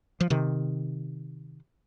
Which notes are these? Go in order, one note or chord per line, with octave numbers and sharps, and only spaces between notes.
F3
C3 D#3